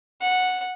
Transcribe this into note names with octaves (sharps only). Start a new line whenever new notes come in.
F#5